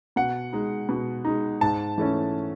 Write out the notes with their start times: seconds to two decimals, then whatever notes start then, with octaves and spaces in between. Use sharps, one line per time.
0.16 B2 F#5
0.53 G#3 D#4
0.89 B2
1.25 G#3 D#4
1.61 G#2 A5
1.98 E3 A3 C#4